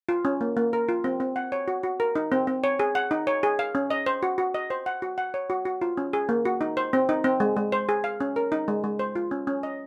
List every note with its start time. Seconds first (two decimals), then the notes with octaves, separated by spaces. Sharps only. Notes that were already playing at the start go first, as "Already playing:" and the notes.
0.09 F4
0.25 C#4
0.41 A#3
0.57 A#3
0.73 A#4
0.89 F4
1.04 C4
1.20 C4
1.36 F#5
1.52 C#5
1.68 F#4
1.83 F#4
2.00 A#4
2.16 D#4
2.32 C4
2.47 C4
2.64 C#5
2.80 G#4
2.95 F#5
3.11 D#4
3.27 C#5
3.43 G#4
3.59 F5
3.75 C#4
3.90 D#5
4.06 C5
4.23 F#4
4.38 F#4
4.54 D#5
4.70 C5
4.86 F#5
5.02 F#4
5.18 F#5
5.34 C#5
5.50 F#4
5.65 F#4
5.81 F4
5.98 C#4
6.13 G#4
6.29 A#3
6.45 F#4
6.61 D#4
6.77 C5
6.93 C4
7.09 D#4
7.24 C4
7.40 G#3
7.57 G#3
7.72 C5
7.89 G#4
8.04 F5
8.20 C#4
8.36 A#4
8.52 D#4
8.68 G#3
8.84 G#3
8.99 C5
9.16 F4
9.31 C#4
9.47 C#4
9.63 D#5